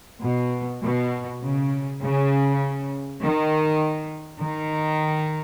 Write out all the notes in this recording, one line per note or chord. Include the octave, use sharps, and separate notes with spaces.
B2
B2
C#3
C#3
D#3
D#3